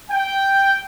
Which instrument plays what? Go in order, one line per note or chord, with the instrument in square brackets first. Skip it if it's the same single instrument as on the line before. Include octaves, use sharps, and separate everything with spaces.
[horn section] G5